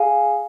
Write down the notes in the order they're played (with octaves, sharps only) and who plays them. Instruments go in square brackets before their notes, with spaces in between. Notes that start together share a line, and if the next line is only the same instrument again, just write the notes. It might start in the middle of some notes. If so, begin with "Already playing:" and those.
Already playing: [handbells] G#4 F5 G#5